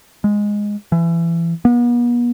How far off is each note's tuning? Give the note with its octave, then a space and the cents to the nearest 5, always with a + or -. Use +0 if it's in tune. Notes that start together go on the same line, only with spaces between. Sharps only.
G#3 -5
E3 +25
B3 -45